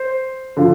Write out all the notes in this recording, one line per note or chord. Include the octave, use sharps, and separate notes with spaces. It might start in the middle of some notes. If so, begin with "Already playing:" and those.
Already playing: C5
D3 F3